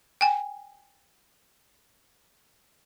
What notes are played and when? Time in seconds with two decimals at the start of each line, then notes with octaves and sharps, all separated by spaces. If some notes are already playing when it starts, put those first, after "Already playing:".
0.21 G5 G#5